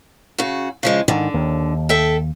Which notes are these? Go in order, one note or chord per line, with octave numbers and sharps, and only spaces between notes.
C#3 F#4
C#3 F3 G#3
G#2 D3 D#3
D#2
A4 E5 G5